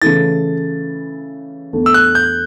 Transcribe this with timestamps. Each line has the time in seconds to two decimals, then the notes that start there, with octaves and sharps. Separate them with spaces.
0.02 C#3 E3 A3 E4 A6
1.73 E2 D3 A3
1.86 E6
1.94 F#6
2.15 G6